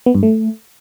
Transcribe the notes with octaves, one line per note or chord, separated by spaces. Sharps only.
B3
G2
A3